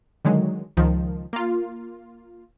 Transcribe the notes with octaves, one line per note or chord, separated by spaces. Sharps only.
D3 D#3 F#3 G#3
C#2 D#3 F3
A#3 F4